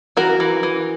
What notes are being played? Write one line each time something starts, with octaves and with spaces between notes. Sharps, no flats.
E3 F#4 A#4
E3
E3